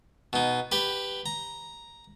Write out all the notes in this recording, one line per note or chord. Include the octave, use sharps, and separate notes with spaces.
B2 D#4
G4 B4
A#5